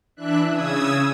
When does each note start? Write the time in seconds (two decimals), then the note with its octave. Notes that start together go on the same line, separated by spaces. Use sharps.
0.16 E3 D4 E5 F#6
0.48 C#3 D#6 E6 G#6